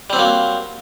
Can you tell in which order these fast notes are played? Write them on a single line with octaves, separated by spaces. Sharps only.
G3 C4 F#3 A#3